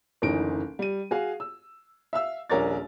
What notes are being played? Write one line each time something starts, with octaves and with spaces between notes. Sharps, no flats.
F#1 D2 E3 D#4 D7
G3 D#7
F#4 G#4 F5
E6
E5 F5 E6
D#1 A#1 A#4 C#5 D5 A6